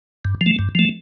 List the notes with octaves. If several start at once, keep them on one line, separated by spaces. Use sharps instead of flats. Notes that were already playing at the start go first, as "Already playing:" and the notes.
G2
F3
A3
G2
F3 A3